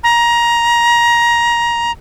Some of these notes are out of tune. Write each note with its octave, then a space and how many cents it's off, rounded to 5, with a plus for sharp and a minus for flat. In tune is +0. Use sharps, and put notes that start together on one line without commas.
A#5 +20